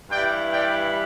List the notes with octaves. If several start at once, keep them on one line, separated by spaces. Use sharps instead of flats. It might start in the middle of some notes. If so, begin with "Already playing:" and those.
G2 E3 G3 E4 D5 G5
D5 G5